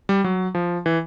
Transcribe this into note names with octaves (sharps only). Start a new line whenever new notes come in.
G3
F#3
F3
E3